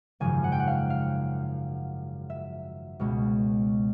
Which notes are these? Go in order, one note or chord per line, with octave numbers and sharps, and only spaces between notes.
G#1 F#2 C#3 F3 G#5
F#5
G5
F#5
F5
F5
E5
C#2 B2 G#3 C#4